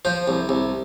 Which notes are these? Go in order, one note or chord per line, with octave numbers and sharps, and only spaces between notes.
F3 C5
C2
C2